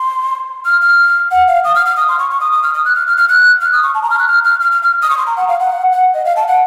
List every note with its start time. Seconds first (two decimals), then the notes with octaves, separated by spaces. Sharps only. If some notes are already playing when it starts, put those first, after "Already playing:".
Already playing: C6
0.66 F6
0.81 F6
1.32 F#5
1.48 F5
1.64 D#6
1.75 F6
1.86 F6
1.96 D#6
2.08 C6
2.19 C#6
2.31 C#6
2.40 D#6
2.52 D#6
2.63 F6
2.74 D#6
2.85 F#6
2.95 F6
3.07 F6
3.17 F6
3.29 F#6
3.61 F6
3.72 D#6
3.83 C#6
3.95 A5
4.03 A#5
4.10 F6
4.19 F#6
4.28 F6
4.44 F6
4.61 F6
4.72 F6
4.83 F6
5.02 D#6
5.10 C#6
5.18 C6
5.27 A#5
5.37 F#5
5.48 F5
5.60 F#5
5.92 F#5
6.14 D#5
6.25 F5
6.36 A5
6.48 F#5